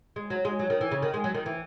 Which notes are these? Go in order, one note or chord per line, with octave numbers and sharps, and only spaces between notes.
G#3
F#3
G#3
F#3
D#3
E3
C#3
D#3
G#3
F#3
D#3
E3